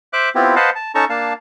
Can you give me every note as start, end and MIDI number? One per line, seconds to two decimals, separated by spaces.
0.13 0.29 72
0.13 0.29 76
0.13 0.29 86
0.13 0.29 90
0.35 0.55 59
0.35 0.55 60
0.35 0.55 64
0.35 0.55 65
0.35 0.55 67
0.56 0.70 71
0.56 0.70 72
0.56 0.70 75
0.56 0.70 77
0.56 0.70 78
0.56 0.70 81
0.75 0.92 81
0.95 1.05 61
0.95 1.05 63
0.95 1.05 69
0.95 1.05 81
0.95 1.05 82
0.95 1.05 85
1.09 1.33 58
1.09 1.33 62
1.09 1.33 77
1.09 1.33 81